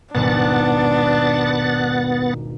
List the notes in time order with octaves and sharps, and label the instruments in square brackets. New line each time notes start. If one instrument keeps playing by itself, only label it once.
[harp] D#1 G#1 B2 [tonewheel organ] B3 F#5 A6 [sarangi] D4